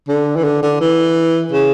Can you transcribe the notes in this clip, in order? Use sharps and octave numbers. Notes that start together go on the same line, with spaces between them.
D3
E3
D3
D3
E3
C#3